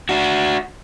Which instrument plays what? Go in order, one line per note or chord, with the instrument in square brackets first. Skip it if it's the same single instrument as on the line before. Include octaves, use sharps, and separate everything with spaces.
[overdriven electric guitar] D4 F#4